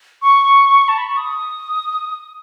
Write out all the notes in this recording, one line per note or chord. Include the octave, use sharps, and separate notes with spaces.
C#6
A5
B5
C#6
D#6